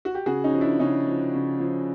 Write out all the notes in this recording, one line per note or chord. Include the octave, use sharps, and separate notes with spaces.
F#4
G4
C#3 F#4 G#4
C#4 D#4
F3
D4 E4
C#3 C#4 D#4
F3
C#3
F3